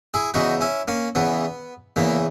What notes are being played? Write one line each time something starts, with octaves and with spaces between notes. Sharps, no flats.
E4 G#4
E2 C#3 E3 D#4 F#4
C#4 E4
A#3 C#4
E2 C#3 E3 B3
E2 C#3 E3 A#3